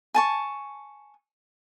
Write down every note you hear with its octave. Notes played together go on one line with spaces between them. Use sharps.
G#5 A5 C#6